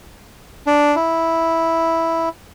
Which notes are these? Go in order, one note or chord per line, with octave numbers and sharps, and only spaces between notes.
D4
E4